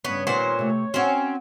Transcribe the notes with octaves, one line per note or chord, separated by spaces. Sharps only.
G2 C#3 B3 C#5
A#2 D#3 G3 B3 C5 F#5
C3 A3
C4 C#4 F#4 F5 F#5